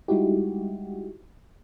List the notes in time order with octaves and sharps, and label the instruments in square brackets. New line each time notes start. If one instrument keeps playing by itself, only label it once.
[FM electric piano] G3 G#3 D#4 E4 F#4 G4